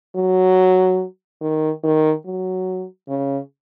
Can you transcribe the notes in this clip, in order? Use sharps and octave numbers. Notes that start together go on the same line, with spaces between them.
F#3
D#3
D#3
F#3
C#3